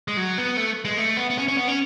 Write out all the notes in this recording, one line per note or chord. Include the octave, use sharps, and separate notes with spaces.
G#3
F#3
B3
A3
G#3
A3
B3
B3
C#4
C#4
B3
C#4